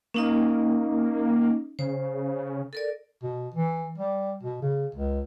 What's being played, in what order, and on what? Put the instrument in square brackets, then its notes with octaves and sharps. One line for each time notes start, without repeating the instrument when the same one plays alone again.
[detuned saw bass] A#3 [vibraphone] C#4 D#4 D#5
[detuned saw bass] C#3 [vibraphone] C5
[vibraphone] A4 A#4 D5
[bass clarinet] B2
E3
G3
B2
C#3
C#2